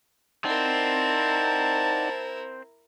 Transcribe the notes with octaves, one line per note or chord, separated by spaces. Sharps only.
C4 D#4 E4 A#4 D5 F#5 A5